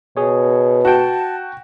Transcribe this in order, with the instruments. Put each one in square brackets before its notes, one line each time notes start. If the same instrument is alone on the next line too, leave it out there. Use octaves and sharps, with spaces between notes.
[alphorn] B2 [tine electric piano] G#4 C#5
[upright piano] F#4 [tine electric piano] F#5 G5 [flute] A5